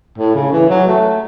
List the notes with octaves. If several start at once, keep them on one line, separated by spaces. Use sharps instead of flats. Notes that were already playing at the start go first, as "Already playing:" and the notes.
A2
C#3
E3
F#3
A3